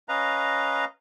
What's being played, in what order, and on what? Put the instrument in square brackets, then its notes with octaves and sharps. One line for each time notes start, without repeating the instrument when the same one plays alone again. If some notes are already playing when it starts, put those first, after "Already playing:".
[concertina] C#4 B4 D#5 F5 A#5